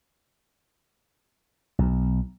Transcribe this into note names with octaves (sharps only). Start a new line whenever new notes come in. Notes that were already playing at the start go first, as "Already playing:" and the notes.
B1